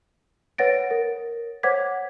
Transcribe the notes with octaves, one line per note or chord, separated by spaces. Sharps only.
B4 C#5 F#5 A6 A#6 D7
A#4
C5 C#5 F#5 D6 G#6 B6